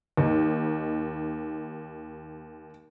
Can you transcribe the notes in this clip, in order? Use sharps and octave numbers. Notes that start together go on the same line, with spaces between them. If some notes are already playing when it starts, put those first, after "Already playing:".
D#2 D#4